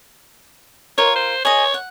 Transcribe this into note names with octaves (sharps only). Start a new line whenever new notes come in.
F4 A#4 C#5
C5
G#4 C#5 D#5
F#5